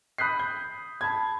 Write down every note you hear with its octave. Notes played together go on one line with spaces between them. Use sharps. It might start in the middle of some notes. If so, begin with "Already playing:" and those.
B5 D#6 F#6 G6 B6 C7
G6
A5 B5 G#6